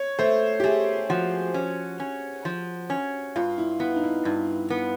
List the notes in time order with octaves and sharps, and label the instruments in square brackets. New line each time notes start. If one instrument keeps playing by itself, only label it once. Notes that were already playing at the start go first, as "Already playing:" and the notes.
Already playing: [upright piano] C#5
[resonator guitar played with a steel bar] A3 [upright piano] C5
[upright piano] G4
[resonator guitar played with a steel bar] A3 [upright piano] G#4
[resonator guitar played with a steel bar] F3 [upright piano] F#4
[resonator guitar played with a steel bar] C#4
C#4
F3
C#4
[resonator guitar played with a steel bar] G2 [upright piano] F4
[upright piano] E4
[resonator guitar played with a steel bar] B3 [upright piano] E4
[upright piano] D#4
E4
[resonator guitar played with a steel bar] G2 [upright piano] E4
[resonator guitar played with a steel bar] B3